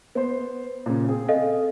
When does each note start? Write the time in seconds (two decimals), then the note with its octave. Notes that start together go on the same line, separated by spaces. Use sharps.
0.15 B3 C5
0.86 A#2 C#3
1.08 C4 G#4
1.29 A4 D#5 F5